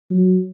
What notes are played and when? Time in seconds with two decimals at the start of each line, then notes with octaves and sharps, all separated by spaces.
0.10 F#3